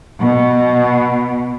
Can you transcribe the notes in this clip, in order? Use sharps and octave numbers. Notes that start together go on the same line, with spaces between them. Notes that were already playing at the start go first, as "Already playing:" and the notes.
B2